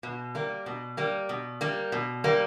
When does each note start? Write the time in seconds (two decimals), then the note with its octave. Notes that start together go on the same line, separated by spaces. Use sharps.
0.03 B2
0.35 G3 A#3
0.66 B2
0.97 G3 A#3
1.29 B2
1.61 G3 A#3
1.92 B2
2.24 G3 A#3